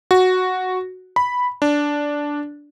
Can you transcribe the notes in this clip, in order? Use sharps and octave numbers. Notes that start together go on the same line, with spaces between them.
F#4
B5
D4